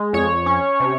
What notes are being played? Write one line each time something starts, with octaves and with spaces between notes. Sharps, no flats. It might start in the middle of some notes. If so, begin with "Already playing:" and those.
Already playing: G#3
F2 C#5
C#4
C3